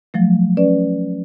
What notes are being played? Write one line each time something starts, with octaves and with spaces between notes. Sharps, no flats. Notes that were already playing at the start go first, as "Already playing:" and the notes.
F3 F#3 A3
C#4 B4 D5